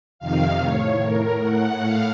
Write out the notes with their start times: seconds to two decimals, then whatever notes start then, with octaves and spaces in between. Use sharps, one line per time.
0.19 F2 C3 D#3 F5
0.60 A2 C#5
1.01 A2 A#4
1.42 A2 F#5
1.82 A2 F5